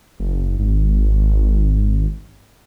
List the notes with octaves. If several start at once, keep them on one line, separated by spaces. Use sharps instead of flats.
F#1
G#1